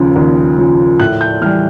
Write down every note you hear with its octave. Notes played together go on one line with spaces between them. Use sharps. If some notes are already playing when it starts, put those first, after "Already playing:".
Already playing: D#2 C#3 F3
D#2
C#3 F3
A2 F#6
G6
E3 G3 F6